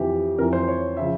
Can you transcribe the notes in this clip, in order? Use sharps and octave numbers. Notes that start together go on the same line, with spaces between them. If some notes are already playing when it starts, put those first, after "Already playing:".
Already playing: F2 C3 E3 G4
F2 E3 A#4
C5
C#5
C#3 F3 E5